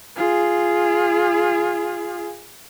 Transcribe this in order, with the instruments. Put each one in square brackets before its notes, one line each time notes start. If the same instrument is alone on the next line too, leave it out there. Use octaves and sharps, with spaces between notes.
[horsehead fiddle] F4 G#4